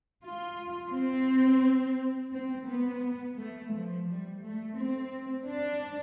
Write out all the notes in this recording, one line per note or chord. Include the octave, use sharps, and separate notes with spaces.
F4
C4
C4
B3
A3
F3
G3
A3
C4
D4